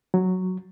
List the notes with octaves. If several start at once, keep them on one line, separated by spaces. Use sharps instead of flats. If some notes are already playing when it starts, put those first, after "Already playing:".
F#3